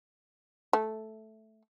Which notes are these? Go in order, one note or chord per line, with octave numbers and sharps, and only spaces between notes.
A3